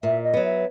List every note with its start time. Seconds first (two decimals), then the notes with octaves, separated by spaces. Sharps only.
0.03 A#2 E5
0.23 D#5
0.34 F#3 B3
0.43 E5